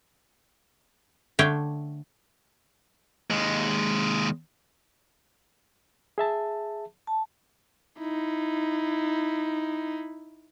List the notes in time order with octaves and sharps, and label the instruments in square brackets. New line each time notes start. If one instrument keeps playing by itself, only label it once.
[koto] D3 A3 D4 C#5 E5 G5
[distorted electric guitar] D#2 G#3
[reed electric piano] G#4 E5 A5
[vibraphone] A5
[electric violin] D#4 E4